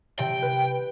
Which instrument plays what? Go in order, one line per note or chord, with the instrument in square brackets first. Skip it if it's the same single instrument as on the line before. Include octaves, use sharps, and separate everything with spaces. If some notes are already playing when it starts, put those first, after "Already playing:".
[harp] C3 [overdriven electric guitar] G5
[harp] B4